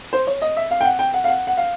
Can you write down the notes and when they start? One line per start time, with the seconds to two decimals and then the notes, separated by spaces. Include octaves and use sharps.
0.13 C5
0.27 C#5
0.42 D#5
0.57 E5
0.71 F5
0.81 G5
0.85 F#5
0.99 G5
1.14 F#5
1.24 F5
1.28 F#5
1.47 F#5
1.57 F5